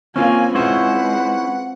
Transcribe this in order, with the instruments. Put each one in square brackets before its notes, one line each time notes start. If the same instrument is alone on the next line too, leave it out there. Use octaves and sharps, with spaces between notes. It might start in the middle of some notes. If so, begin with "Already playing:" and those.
[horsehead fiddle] A#3 G#5 [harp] C4 F4 [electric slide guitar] C#4
[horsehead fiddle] G#3 B4 [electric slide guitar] C#4 E4 C5 [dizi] F#5